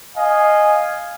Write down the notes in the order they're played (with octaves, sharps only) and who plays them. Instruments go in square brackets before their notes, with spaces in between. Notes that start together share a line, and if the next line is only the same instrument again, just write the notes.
[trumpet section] D#5 F5 G#5